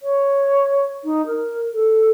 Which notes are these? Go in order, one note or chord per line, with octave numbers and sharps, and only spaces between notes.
C#5
D#4
A#4
A4